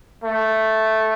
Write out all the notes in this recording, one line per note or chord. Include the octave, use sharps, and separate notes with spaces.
A3